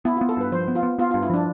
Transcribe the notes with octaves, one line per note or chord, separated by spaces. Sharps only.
B3 E4
F4
B3
A4
G2 B4
F3 C5
B3
F4
B3
B3 F4
F4
G2
E4
F3 D4